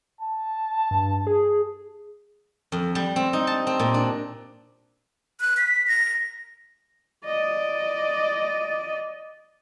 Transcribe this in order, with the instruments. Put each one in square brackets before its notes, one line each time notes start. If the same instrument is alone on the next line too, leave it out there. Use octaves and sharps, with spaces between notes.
[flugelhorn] A5
[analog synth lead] G2
G#4
[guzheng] F2
G3
C4
D#4
A5
C4
A#2
D4
[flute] F#6
B6
A#6
[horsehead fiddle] D5 D#5